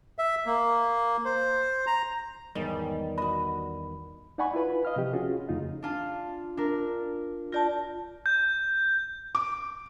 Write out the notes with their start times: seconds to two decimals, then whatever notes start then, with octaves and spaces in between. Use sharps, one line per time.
0.19 E5
0.46 A#3
1.25 C5
1.87 A#5
2.55 E2 G#2 D#3 G3 C#4
3.18 F#4 D#5 B5
4.38 D#4 D5 F#5 G#5 B5 C#6
4.54 E4 F4 B4 B5
4.85 D#5 F5 F6
4.96 C3 F3 G4
5.13 C#4 F4 F#4 G#4
5.49 F2 C#3 A3 D#4 F4
5.82 D4 F4 A5
6.57 D4 A#4
7.52 F4 D5 A5 G6 A#6
8.26 G6
9.35 D6